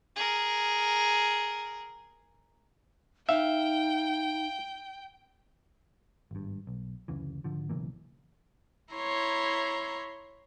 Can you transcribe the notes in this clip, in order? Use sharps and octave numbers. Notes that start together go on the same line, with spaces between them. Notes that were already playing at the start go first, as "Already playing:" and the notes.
G#4 A#4
D#4 E5 F5 G5
G#1 G2
B1
F#1 D2 C#3 E3
G#1 D3 F3
B1 C#3 E3 A#3
E4 C#5 A#5 C6